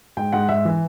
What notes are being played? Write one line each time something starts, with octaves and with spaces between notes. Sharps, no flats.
G#2 G5
G#2 F#5
G#2 E5
E3